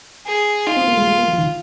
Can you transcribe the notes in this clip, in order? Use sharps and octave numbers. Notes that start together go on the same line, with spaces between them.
G#4
D#4 F4
C4
A#3
G#3
G#3
A#3
F3
D#3